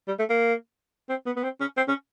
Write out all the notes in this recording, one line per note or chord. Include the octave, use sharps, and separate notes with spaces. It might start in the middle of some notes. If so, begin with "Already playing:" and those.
G3
A3
A#3
C4
B3
B3
C4
C#4
C4
C#4